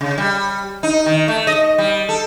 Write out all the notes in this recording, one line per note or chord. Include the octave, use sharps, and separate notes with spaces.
C#3
G3
D#4
D#3
A3
D#5
G3
A4